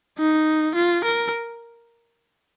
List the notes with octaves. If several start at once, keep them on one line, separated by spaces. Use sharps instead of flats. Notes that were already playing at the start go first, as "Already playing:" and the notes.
D#4
F4
A#4